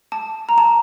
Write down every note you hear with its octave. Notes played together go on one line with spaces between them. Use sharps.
A5
A#5
A5